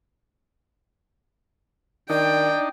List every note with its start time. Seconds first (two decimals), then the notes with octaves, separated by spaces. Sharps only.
2.10 D#3 D4 D#4 D5 G5